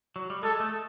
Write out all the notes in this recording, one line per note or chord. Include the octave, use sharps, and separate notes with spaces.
F#3
G3
G#3 A4
A3